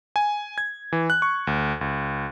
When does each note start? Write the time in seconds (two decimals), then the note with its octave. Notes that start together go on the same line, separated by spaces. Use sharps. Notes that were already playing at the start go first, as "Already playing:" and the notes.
0.16 G#5
0.58 G#6
0.93 E3
1.10 F#6
1.22 C#6
1.47 D2
1.81 C#2